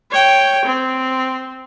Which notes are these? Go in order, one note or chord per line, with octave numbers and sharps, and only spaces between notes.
C#5 G5
C4